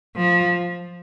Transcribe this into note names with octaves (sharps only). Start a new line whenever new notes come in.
F3